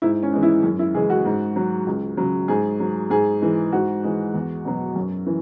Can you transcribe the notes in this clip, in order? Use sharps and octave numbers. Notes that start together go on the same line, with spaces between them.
G#2 E4
C#4
E3 G#3
E4
F#2
E4
C#3 E3 G#3 G#4
F#4
G#2
F#3
C#2
C#3 F#3
G#2 G#4
F#3
G#2 G#4
E3 G#3
G#2 F#4
E3 G#3
E2
B2 F#3
F#2
E3